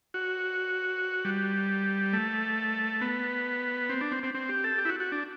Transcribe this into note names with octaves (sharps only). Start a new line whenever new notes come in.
F#4
G3
A3
B3
C4
D4
C4
C4
C4
G4
A4
G4
E4
F#4
F#4
D4